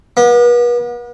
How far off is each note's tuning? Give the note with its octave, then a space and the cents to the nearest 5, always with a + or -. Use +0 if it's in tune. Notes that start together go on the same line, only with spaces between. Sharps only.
B3 -40